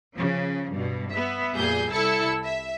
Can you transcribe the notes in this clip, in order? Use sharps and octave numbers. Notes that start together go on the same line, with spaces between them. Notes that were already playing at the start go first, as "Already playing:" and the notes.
C#3 F3
G2 B2
B3 E5
F2 A#2 G3 G#4 G6
C2 E4 A4 A5 E6 C#7
E5